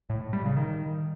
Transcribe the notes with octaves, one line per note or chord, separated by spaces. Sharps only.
A2
A2
G3
C#3
D#3